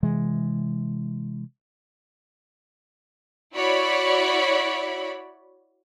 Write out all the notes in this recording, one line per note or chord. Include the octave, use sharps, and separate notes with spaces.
C3 E3 G#3
E4 F#4 C#5 D5 B5